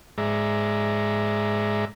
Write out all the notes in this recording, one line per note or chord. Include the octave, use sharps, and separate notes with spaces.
G#2 G#3 D5 E5 A#5